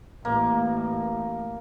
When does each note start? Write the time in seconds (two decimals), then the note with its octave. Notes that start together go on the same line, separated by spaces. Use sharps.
0.25 A1 A#3